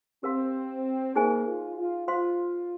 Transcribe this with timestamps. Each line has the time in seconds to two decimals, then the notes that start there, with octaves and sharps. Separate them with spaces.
0.23 C4 G4 A#4 F5 C6
1.15 A#3 D#4 G#4 C5 D#5 G#5
1.47 F4
1.77 F4
2.07 F4 C5 F5 C6